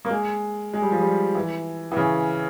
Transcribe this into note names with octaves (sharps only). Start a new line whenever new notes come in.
A#3
G#3
G#3
G3
F3
G3
E3
E3
C#3